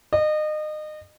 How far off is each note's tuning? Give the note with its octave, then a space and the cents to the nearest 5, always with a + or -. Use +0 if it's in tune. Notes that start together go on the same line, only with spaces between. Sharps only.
D#5 -30